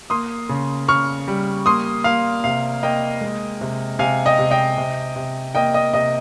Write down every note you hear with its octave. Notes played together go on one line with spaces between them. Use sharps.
A#3 C6 D#6
C#3
C#3 C#6 F6
G3
A#3 C6 D#6
A#3 F5
C3 F5
A#3 D#5 G5
G#3
C3
C3 F5 G#5
D#5 G5
C3
D#5 G5
C3
C3
A#3 D#5 G5
D#5
C3 D#5